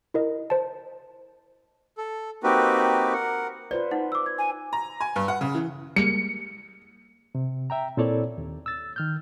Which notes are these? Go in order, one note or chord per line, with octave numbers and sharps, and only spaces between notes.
E4 A#4 D#5
C5 A5
A4
A#3 C4 D#4 F#4 G4 B4
A#4 F#5
F4 B4 C5 D5
D#4 F#5
D6 E6
G#6
G#5
A#5
G#5
G2
F#5
C#3
E3
G3 G#3 A#3 C#7
C3
E5 G5 A#5
A#2 C4 E4 A4 C#5 D5
D#2
E6 A6
D#3 F6 G6